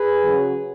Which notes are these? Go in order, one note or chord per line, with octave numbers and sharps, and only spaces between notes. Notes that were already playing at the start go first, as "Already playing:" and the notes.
Already playing: G#4 B4
C#3 F#3